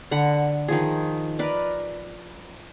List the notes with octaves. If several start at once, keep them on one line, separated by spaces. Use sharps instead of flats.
D3 F#5 B5
D#3 F3 G#4
A#4 B4 D5